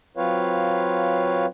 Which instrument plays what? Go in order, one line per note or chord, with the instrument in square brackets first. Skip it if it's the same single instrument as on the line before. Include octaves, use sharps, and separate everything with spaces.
[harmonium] F#3 C4 F4 B4 C#5 F5